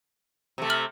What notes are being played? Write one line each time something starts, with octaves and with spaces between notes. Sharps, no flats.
C3 A3
F6 F#7